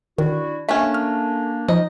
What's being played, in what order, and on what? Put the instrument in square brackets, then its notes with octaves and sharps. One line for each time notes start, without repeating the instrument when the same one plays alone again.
[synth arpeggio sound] D#3 [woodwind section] D4 E4 F#4
[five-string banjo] A3 C#4 [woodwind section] A#3 D4 [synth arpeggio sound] E5 A5
[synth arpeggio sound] F6
[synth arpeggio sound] F3 [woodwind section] D#4 [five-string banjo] D#5